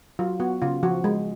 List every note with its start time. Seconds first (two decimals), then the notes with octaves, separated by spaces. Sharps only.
0.19 F#3 F4
0.40 B3 F#4
0.62 C#3 F4
0.83 F3 F#4
1.04 G#3